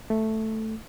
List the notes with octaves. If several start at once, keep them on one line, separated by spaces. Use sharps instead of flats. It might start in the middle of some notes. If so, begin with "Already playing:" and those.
A3